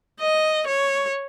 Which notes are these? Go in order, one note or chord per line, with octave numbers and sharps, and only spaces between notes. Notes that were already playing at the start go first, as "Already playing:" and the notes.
D#5
C#5